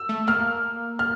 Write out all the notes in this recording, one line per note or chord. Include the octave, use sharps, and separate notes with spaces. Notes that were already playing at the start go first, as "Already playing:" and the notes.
Already playing: E6
A3
A#3 F6
F6